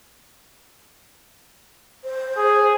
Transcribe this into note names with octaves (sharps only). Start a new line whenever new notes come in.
C5
G#4